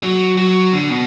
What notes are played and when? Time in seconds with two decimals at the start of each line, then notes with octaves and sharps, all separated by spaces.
0.03 F#3
0.37 F#3
0.73 D3
0.90 B2